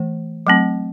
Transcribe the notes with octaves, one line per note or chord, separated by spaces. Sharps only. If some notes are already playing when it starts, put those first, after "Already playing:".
Already playing: E3 A3
F#3 A3 C4